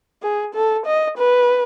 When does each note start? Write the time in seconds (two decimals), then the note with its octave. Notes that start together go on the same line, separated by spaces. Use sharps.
0.22 G#4
0.54 A4
0.86 D#5
1.18 B4